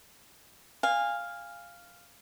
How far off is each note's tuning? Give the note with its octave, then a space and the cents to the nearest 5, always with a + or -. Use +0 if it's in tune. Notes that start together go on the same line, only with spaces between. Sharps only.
F5 +0 G#5 -25